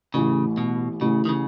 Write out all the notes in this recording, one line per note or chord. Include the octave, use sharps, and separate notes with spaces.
A1 A2 C#3 E3
B2
A1 A2 C#3 E3
D#3
C#3